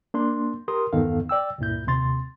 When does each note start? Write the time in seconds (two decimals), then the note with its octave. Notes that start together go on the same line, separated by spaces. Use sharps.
0.14 A#3 D4 C6
0.68 G4 A#4 C6 D#6
0.93 E2 G2 D#3 B3 A4 F5
1.29 D5 G5 E6
1.58 C#2 G2 A#2 E4 G6
1.87 D#2 C3 C6 A6